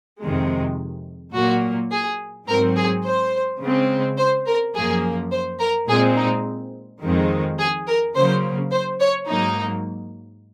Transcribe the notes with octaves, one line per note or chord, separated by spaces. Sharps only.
F2 C3 D#3 G#3
A#2 F#3 A#3 F#4
G#4
G#2 F#3 C4 A#4
G#4
C5
C#3 G#3 C4
C5
A#4
F#2 F3 A#3 G#4
C5
A#4
A#2 G#3 C4 G#4
D#4
F2 D#3 G#3 C4
G#4
A#4
C#3 F#3 A#3 C5
C5
C#5
G#2 F#3 A#3 D#4